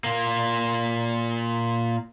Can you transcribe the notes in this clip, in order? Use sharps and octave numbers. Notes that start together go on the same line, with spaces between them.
A#2 A#3